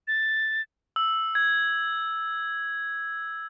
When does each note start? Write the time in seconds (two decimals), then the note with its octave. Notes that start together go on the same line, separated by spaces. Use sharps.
0.08 A6
0.96 E6
1.35 G#6